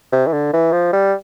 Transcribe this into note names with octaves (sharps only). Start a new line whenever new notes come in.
C3
E3
D3
E3
F3
G3